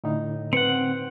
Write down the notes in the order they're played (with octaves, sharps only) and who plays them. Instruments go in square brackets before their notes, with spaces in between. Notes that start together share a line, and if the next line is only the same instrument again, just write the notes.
[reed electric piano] A2 D3 D#4
[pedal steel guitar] C4 F#5 [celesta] B4 C#7